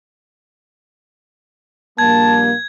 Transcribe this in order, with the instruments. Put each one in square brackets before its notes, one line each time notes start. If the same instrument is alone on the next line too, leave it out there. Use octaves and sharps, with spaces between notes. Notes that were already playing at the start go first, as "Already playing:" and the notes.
[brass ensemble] A#1 G3 A#3 [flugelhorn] A5 [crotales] G#6